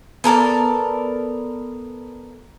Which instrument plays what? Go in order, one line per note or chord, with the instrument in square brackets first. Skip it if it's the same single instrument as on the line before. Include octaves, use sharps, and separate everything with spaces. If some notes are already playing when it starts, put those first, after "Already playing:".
[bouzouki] B3 A4 A#4 D5